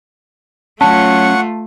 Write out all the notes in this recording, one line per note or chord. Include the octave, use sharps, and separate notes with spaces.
F#3 A3 C#4 F4 F#5 A5 C#6